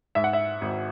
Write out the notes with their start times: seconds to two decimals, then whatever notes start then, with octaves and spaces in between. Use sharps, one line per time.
0.15 G#2 E5
0.24 F#5
0.33 E5
0.61 G#1